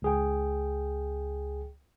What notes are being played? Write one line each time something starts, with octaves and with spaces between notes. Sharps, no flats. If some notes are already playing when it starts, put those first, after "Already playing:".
C#2 G#4 G5